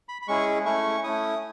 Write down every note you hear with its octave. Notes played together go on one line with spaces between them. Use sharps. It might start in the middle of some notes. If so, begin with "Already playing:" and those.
B5
B5
G#3 C#4 E4 G#4 C#6
A3 C#4 E4 C#6
A3 C#4 E4 D#6